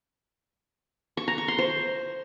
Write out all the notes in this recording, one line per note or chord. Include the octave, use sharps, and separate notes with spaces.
C#6
A#5
C#6
C6
C5